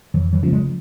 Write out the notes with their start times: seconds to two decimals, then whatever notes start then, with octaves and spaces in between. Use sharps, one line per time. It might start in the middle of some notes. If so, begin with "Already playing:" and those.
0.14 F2 E3 F#3
0.33 E3 F#3
0.43 C#3 F3 A3
0.53 F#3 G#3